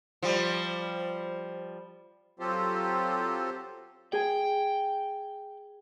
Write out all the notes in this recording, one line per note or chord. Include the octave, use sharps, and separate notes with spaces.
F3 G3
F#3 C4 F4 G4 A4 C5
G#4 G5 G#5